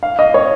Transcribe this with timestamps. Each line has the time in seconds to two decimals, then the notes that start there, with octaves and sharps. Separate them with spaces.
0.03 F5
0.19 D#5
0.34 C#5